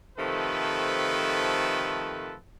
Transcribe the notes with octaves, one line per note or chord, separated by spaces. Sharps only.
C3 D#3 F3 A3 A4 B4